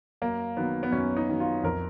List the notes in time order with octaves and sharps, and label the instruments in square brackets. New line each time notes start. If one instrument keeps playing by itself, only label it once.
[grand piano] F#2 A#3
D#3 F#3 B3
B3
F#2 C#4
D#4
D#3 F#3
F4
F2 A#4